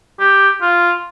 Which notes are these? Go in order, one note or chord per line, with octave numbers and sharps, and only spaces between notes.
G4
F4